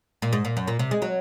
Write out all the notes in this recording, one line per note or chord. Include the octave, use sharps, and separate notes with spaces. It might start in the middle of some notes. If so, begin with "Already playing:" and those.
A#2
G#2
A#2
F#2
A#2
C3
G#3
F#3